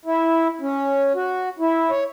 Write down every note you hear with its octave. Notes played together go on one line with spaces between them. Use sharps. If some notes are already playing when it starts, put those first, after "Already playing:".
E4
C#4
F#4
E4
C#5